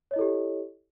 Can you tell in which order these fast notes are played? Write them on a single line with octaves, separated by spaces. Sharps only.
C#5 D#5 E4 A4 G4